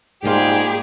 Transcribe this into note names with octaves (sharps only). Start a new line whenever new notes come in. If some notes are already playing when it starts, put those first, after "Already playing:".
G#2 G3 A#3 F4 G4 G#4